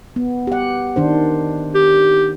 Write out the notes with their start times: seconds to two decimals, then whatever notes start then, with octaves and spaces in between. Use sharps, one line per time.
0.16 B3
0.47 G4 F#5
0.96 D#3 D4 C5
1.75 G4